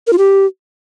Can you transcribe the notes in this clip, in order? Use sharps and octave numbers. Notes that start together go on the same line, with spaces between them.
A#4
F4
G4